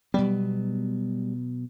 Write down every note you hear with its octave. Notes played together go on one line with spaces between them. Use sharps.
B2 F#3 G3 B3